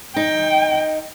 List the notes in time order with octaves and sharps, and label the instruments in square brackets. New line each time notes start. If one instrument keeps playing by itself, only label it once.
[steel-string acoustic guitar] D#4 [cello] G5